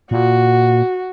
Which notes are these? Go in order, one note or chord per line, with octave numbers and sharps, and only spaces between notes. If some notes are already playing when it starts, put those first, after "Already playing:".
A#2 F#4